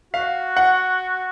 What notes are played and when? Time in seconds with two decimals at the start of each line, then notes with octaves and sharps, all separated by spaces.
0.13 F#4 F5
0.57 F#5